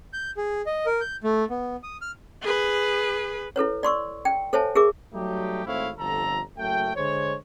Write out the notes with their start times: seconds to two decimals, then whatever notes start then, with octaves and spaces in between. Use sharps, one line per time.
0.13 G6
0.37 G#4
0.66 D#5
0.86 A#4
1.01 G6
1.24 A3
1.50 B3
1.83 D#6
2.01 F6
2.42 G#4 B4
3.56 E4 A4 B4 C#5
3.83 D5 C6 C#6 E6
4.25 G5
4.53 A4 C5 C#5 E5 G#5 A5
4.75 G#4 A#4 E5 D6
5.13 F#3 G3 A3 D#4 G4
5.66 G#1 A3 C4 E4 C#5 F5
5.98 G1 F2 D3 A4 A#5
6.58 F#1 F#2 A3 G5
6.96 D3 G#3 C5 C#5